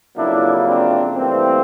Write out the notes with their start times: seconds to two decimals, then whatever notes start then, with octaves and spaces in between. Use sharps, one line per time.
0.15 F2 C#3 F#3 A#3 D4 E4
0.66 C4 D4
1.16 G2 E3 A3 A#3 C4